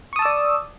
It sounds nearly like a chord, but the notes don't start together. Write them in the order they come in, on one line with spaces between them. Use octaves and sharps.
C#6 D#6 A5 E6 D5